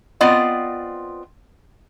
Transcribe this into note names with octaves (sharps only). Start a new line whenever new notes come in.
B3 C4 F4 D5 D#5